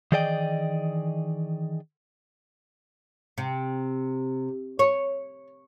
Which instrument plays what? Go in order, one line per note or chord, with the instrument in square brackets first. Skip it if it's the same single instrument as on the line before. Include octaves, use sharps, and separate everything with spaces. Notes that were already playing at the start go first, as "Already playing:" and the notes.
[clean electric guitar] D#3 E3 G#4 D5 D#5 G5
[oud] C3
C#5